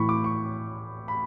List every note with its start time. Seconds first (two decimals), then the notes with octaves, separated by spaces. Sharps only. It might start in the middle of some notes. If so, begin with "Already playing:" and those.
Already playing: A2 E3 B5 C#6
0.09 D6
0.24 C#6
1.08 B5